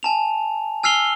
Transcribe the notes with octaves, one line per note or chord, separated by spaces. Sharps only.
G#5 A5 F7
G#5 E6 F6 C7 F7 G7